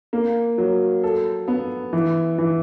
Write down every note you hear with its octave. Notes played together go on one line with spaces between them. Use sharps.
A#3
F#3
A4
B3
E3
E3